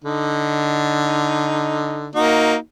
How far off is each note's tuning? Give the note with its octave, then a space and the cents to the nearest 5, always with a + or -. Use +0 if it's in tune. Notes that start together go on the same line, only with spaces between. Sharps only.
D3 +0 D#4 +0
A#3 +0 D#4 +15 F#4 -15